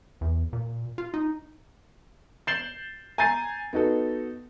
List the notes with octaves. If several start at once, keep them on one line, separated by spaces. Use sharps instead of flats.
E2
A#2
F4
D#4
G6 A6 C7 E7 F#7 G7
G#5 A#5 G6 A6 C7 D#7
B3 D#4 F#4 A4